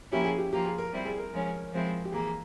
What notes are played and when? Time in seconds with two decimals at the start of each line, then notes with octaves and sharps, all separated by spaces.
0.12 F3 A#3 C#4 E4 G4
0.25 G#4
0.38 G4
0.52 F3 A#3 F4 G4
0.65 G#4
0.78 A#4
0.92 G3 C4 E4
1.05 G#4
1.19 A#4
1.32 F3 G#3 C#4
1.72 F3 G#3 C4 E4
2.05 G4
2.12 E3 A#3 G#4